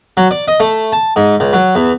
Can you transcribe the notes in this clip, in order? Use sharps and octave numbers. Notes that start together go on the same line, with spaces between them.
F#3
D5
D#5
A3
A5
G#2
C#2
F#3
E2